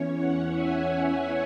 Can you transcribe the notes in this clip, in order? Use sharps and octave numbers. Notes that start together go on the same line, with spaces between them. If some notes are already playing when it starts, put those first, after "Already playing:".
Already playing: E2 E3 C#4 C#5
C#5 F#5
E5 G#5